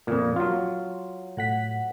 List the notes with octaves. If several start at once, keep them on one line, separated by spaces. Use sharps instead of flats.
F2 A#2
F#3 F4
A2 F#5 B6